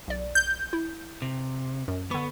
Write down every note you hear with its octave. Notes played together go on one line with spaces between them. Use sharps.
B1 D5
G6
E4
C3
F#2
D3 B3 C#6